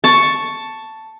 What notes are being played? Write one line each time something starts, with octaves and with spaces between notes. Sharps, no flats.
A5 C#6